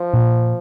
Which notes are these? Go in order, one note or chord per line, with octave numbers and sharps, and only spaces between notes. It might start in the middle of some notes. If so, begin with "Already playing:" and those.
Already playing: F3
A#2